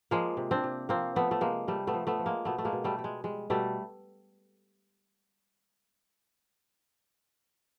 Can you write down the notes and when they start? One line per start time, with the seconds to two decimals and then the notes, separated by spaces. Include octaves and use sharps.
0.11 F3 G#3 A#3
0.37 C3
0.51 C4 D4
0.64 C3
0.89 F3 A#3 C4
1.16 F3 A3 B3
1.31 A3
1.41 C3 G#3 A#3
1.68 C3 G3 A3
1.87 A3 B3
1.94 F3
2.07 A3 B3
2.19 F3
2.26 G#3 A#3
2.45 B2 A3 B3
2.58 A3
2.65 G#3 A#3
2.72 B2
2.84 G3 A3
2.99 G3
3.04 G#3
3.24 G3 G#3
3.50 B2 G3 A3